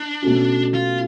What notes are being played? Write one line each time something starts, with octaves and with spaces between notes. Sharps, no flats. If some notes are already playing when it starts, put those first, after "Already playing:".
Already playing: D4
B2 A3 C#4 F#4
F4